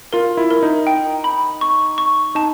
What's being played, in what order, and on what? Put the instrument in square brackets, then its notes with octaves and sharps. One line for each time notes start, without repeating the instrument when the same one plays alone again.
[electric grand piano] F4 [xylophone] A#4
[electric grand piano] E4
[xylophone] A#4
[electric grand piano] D#4
[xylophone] G5
B5
C#6
C#6
[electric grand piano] D#4 [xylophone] A5